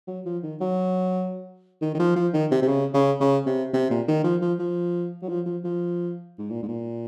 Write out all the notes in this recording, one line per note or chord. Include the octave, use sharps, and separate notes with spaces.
F#3
F3
D#3
F#3
D#3
D#3
F3
F3
D#3
C3
C3
C#3
C#3
C#3
C3
C3
A#2
D#3
F3
F3
F3
F#3
F3
F3
F3
G#2
A#2
G#2
A#2